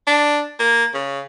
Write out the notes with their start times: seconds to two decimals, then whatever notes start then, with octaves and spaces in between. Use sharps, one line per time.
0.07 D4
0.60 A#3
0.94 C#3